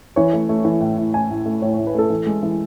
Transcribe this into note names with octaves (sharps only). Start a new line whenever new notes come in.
E3 C#5
A3
A3
E3
A2
A2
A2 G#5
A2
A3
A2 C#5
C#5
A2
B4
A3 A4
E3
G#3
E3